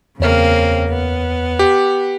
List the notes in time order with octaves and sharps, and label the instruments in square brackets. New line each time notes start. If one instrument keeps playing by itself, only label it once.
[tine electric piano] E2 C#5 F6 [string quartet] C#3 A#3 C4
[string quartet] B3
[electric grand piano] G4